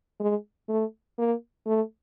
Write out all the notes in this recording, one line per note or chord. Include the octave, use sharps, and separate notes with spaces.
G#3
A3
A#3
A3